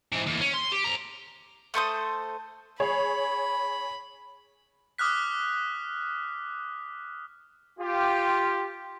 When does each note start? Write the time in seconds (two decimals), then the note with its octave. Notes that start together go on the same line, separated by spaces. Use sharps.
0.13 G#2 E3
0.26 D#2 E3
0.41 C#4
0.54 C6
0.72 G4
0.84 F2 A#5
1.74 A3 A4 C5 D#6
2.80 G#4 C#5 B5
4.98 D6 D#6 F6 F#6 B6
7.80 F4 G4